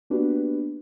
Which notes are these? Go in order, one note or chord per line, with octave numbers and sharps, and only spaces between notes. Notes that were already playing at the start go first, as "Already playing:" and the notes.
A#3 B3 D4 F#4 G4 B4